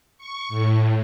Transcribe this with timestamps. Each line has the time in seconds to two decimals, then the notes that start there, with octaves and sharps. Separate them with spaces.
0.18 C#6
0.48 A2